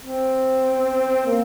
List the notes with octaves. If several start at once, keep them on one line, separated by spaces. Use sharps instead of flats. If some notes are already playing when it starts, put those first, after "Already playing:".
C4
A#3